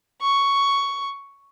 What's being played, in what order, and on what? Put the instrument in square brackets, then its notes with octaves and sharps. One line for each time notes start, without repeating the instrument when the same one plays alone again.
[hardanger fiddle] C#6